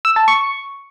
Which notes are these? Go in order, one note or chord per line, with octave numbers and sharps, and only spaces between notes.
E6
A5
C#6